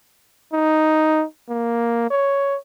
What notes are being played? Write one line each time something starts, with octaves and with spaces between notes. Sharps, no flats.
D#4
A#3
C#5